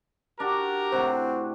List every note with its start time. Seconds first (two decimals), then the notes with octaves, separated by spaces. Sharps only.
0.40 D4 F#4 G4 A#4 A#5
0.92 A2 C3 C4 F#4